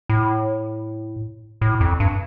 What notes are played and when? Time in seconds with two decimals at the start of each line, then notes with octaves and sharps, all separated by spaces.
0.09 A2
1.61 A2
1.81 F2
2.00 G2